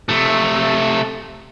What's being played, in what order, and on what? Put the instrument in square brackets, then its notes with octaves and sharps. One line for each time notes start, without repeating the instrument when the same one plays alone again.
[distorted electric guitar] C3 A3